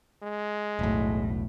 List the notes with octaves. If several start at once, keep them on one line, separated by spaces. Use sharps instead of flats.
G#3
E1 B1 A2